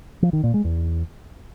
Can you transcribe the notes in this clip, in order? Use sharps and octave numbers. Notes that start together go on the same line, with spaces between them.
F3
D#3
A#2
G#3
E2